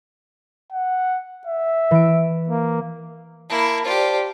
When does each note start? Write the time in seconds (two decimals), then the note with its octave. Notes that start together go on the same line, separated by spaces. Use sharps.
0.72 F#5
1.47 E5
1.91 E3 D7
2.49 A#3
3.50 A#3 E4 A5 B5
3.85 F4 G4 C5 D5 A5